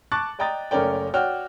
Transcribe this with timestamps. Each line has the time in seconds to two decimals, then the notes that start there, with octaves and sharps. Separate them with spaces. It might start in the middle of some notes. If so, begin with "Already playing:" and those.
0.12 A5 C#6 D6 F#6 A6
0.39 D5 D#5 G5 A#5 D#6 A6
0.71 F#1 A3 C#4 A#4 D5 G5
1.14 F#4 C#5 D5 G5 F6